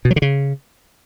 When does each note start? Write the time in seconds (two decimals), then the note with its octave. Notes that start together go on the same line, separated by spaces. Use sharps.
0.05 B2
0.11 F#3
0.16 D3
0.22 C#3